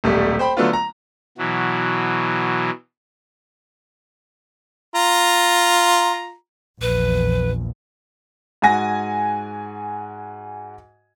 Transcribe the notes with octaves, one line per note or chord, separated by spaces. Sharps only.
D#1 B1 G3 A3
C5 G5 B5
D3 F#3 A3 B3 D4 F4
A#5
B2 E3 F#3
F4 A#5
A#1 E2 B4
G#2 F#4 G#5 A#6